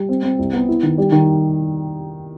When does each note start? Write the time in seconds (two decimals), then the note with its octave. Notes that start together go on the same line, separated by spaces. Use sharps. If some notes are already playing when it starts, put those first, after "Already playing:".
Already playing: G3
0.09 C4
0.23 C4
0.39 C2
0.53 B3
0.68 E4
0.83 D#3
0.98 G3
1.12 D#3